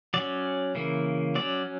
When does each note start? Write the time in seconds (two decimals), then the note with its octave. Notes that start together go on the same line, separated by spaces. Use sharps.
0.14 F#3 C#4 D5
0.75 C#3 E3 A#3
1.35 F#3 C#4 D5